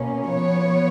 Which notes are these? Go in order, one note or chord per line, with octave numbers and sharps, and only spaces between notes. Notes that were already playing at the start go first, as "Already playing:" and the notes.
Already playing: B2 A#3 C#4
F3 B3 C#5